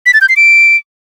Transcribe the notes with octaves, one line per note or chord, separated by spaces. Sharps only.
B6
A6
G6
C7
D7